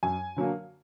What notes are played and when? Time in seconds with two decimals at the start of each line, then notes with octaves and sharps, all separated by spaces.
0.03 F#2 G#5
0.36 D3 F#3 A#3